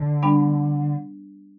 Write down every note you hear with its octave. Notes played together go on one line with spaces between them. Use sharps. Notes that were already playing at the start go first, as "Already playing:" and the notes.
Already playing: D3
G3 B3 D4